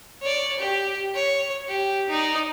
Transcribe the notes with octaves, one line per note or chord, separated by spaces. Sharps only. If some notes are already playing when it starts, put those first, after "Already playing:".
C#5 D5
G4
C#5
G4
D#4 D5